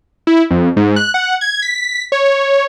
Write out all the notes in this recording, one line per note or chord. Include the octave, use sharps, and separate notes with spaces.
E4
F2
G#2
F#6
F#5
G#6
B6
C#5